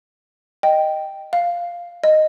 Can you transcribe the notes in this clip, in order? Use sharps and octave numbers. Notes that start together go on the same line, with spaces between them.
D#5 G5
F5
D#5